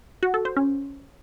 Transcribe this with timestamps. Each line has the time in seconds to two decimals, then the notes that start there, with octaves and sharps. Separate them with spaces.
0.23 F#4
0.34 A4
0.45 C5
0.56 C#4